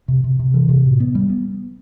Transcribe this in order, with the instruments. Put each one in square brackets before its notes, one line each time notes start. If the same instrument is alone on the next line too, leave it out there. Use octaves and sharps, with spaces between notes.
[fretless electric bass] C3
C3
C3
E3
C3
A2
B3
G3
B3